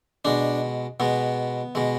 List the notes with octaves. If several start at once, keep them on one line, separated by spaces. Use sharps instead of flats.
B2 G#3 D4
B2 G#3 B3
B2 G#3